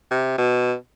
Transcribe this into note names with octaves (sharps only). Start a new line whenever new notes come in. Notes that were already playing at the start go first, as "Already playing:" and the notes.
C3
B2